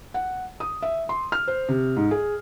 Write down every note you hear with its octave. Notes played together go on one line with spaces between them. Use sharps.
F#5
D#6
E5
C6
F6
C5
C3
G#2
G#4